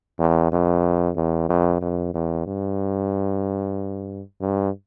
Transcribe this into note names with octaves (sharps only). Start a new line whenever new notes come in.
E2
F2
E2
F2
F2
E2
G2
G2